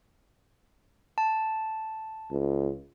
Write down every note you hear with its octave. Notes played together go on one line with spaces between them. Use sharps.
A5
C#2